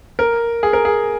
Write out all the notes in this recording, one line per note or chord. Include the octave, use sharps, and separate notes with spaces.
A#4
G#4
A#4
G#4